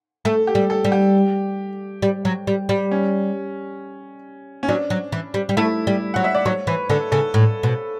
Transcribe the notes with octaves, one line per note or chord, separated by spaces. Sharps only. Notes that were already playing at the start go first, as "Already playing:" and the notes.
A3 A4
G4
G3
A4
G3
G4
G3
F#3
G3
G3
C#4
C#4
F#3 D4
F#3
E3
G3
G3
A3 E4
G3
F#3 F#5
E5
D5
F#3 C#5
E3 B4
D3 A4
C#3 A4
A2
B2